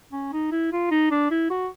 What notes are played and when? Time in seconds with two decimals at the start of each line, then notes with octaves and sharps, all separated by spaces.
0.12 C#4
0.32 D#4
0.51 E4
0.72 F4
0.91 D#4
1.11 D4
1.31 E4
1.50 F#4